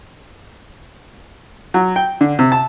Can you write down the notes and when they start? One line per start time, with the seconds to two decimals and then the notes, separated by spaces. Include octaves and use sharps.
1.74 F#3
1.96 G5
2.21 D3
2.39 C3
2.52 A5